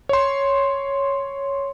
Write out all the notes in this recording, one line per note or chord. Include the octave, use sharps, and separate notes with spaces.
C#5 C6